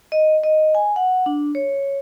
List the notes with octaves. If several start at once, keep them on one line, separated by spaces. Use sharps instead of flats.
D#5
D#5
G#5
F#5
D4
C#5